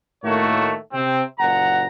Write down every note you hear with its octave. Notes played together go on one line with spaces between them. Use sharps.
A2 D#3 A3 A#3 F#4 C#5
C3 C4
F#1 A#2 F#5 A#5